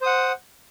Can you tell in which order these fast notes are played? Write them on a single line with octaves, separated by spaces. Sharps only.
C5 D#6 F#5